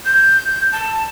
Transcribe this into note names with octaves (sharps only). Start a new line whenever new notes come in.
G6
A5